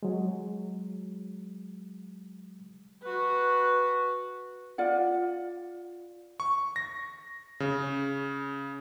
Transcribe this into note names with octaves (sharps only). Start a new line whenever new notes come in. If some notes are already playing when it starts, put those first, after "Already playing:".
F#3 G#3
F#4 B4
F4 D5 F#5
C#6
A#6
C#3